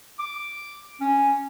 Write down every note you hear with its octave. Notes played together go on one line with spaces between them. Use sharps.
D6
C#4